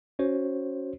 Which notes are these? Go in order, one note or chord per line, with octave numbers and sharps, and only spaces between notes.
C#4 F#4 C5 C#5